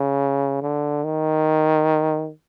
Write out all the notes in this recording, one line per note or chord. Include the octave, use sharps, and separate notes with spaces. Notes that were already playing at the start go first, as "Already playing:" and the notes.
Already playing: C#3
D3
D#3